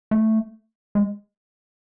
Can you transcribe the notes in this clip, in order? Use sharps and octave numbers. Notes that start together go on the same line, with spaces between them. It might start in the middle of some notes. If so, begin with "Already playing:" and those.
A3
G#3